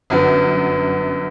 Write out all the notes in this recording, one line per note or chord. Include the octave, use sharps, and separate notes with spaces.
G1 F#2 B3